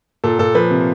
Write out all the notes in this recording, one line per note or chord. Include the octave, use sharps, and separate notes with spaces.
A#2 A4
A#2 A4
F3 B4
C3